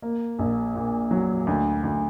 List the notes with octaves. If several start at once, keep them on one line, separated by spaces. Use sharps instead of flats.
A#3
A#1
A#2
F#3
D2
D2